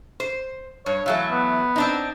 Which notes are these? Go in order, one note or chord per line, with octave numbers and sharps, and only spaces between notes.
C5
G2 C#5
E3 F#3 A3 F5
B3
C4 D4 D#4